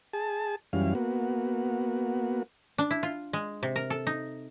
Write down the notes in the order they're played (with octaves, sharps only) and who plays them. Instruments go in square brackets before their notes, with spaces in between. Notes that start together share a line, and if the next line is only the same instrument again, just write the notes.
[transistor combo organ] G#4 A5
F#2 E3 G3 C#4 F5
A#3 B3 F#4
[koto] D4
E4
F4
G#3
C3
A#4
A4
D#4